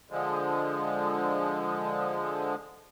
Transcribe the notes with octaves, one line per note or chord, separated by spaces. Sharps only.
D3 F3 G#3